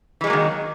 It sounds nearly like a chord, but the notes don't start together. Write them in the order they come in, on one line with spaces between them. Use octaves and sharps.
E3 G#3 F#3 A#3 D#3